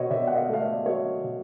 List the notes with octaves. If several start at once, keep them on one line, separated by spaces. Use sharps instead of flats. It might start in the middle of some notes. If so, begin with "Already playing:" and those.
Already playing: B2 C5 C#5 D#5
B2 D5 E5
F#5
D#5 F5
A3 F5
D5 E5
F#3 C#5 D#5
B2